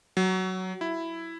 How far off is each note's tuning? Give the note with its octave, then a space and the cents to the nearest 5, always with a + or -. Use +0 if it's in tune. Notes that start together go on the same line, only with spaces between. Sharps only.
F#3 +10
E4 +5